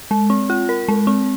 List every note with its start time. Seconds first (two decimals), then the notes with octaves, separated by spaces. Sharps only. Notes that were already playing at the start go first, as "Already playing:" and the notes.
0.11 G#3
0.30 C4
0.50 F4
0.69 A#4
0.88 G#3
1.07 C4